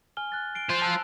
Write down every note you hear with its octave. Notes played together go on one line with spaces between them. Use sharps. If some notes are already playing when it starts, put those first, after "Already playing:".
G#5 F6 G7
F#6 A6
C7 D7 G7
F4 C5
A5 E6 F#6